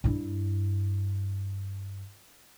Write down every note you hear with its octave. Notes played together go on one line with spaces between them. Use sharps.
G2 E4